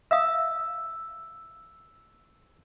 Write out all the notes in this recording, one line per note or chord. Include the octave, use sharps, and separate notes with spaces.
E5 F5 D#6 E6